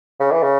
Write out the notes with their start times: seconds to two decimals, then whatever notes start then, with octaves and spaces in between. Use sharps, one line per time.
0.20 C#3
0.32 E3
0.43 C#3